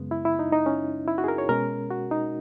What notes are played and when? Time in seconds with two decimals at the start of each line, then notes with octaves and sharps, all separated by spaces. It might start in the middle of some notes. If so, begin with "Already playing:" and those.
Already playing: F#2 C#3 G#3 B3
0.11 E4
0.25 E4
0.39 D#4
0.52 D#4
0.66 C#4
1.07 E4
1.18 F#4
1.24 G#4
1.28 A#4
1.38 C#5
1.49 B2 G#3 C#4 A#4
1.91 F#4
2.11 D#4